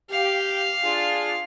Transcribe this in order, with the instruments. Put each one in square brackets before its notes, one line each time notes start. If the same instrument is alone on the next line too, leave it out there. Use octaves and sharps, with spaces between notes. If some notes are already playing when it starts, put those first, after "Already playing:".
[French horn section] G4 [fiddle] F5
[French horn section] D4 F4 G#4